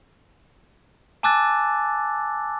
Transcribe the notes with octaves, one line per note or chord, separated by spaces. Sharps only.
G#5 A5 D6 E6 F#6 A6